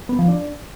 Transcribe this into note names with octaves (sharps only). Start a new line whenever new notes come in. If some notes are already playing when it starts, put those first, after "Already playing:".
B3
F3
D4